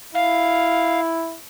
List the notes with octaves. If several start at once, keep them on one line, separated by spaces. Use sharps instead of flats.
E4 F5